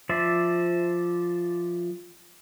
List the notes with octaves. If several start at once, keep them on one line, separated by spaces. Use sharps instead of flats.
F3 C5 D5 E5